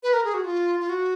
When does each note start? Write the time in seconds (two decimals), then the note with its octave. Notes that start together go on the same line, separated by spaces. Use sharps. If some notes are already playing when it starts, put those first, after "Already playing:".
0.03 B4
0.13 A#4
0.24 G#4
0.34 F#4
0.44 F4
0.80 F4
0.89 F#4